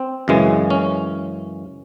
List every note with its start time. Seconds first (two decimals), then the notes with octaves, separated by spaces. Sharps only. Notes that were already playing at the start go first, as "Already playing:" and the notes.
Already playing: C4
0.28 F#2 C#3 E3 G#3
0.70 C#4